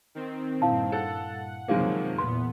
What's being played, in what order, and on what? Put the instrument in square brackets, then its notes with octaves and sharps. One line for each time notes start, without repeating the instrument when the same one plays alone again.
[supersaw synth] D#3 C4
[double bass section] G2 A#2 [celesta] E4 F5 A5
[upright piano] A4 [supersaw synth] F#5
[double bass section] F#1 C3 [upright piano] D#3 G#3 A#3 [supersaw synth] F3 F#3
[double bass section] E2 A#2 [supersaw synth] B3 [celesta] C6